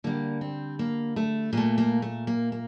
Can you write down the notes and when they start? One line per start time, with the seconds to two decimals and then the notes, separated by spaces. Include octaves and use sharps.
0.04 D3 G3 A#3
0.41 C4
0.79 A#3
1.16 A3
1.53 A#2 A3 A#3
1.78 A#3
2.02 A3
2.27 A#3
2.52 A#3